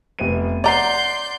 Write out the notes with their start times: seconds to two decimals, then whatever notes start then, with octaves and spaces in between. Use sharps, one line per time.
0.19 F1 B3 D#7
0.64 C#5 D5 F#5 A#5 C6 G6 C7